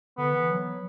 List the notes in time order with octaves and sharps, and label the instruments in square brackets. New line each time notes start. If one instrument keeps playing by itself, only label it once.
[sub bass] D3 [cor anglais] B3
[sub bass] E3
F#3